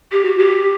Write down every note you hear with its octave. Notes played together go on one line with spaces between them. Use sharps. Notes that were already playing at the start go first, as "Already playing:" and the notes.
G4
F#4
G4